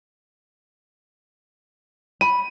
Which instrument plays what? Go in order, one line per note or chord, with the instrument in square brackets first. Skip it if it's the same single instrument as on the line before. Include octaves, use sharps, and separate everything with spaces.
[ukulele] B5 [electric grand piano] D#7